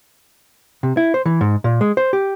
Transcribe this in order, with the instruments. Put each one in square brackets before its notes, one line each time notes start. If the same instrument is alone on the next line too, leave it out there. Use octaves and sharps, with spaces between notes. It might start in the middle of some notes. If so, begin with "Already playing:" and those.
[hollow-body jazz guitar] C3
E4
C5
E3
G#2
A#2
G#3
C5
G4